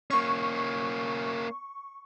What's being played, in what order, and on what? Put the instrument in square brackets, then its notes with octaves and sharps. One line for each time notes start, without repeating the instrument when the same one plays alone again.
[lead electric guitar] A#3 C#4 [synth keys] C#6